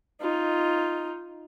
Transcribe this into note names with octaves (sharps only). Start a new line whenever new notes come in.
D#4 F4